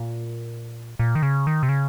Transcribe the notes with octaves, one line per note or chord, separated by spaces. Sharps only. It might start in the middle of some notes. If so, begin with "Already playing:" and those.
Already playing: A#2
A#2
D#3
C#3
D#3
C3
C#3